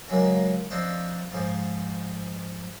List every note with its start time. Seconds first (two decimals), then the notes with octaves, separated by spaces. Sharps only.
0.08 C#3 F#3 G#3 A#3
0.71 F3 C4 D4 D#4
1.31 G#2 F3 G#4